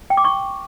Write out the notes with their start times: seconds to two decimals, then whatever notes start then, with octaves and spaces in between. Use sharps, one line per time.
0.10 G5
0.17 D6
0.25 C#6